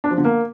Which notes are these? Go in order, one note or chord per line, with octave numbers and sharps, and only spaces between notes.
D4
F3
D3
A#3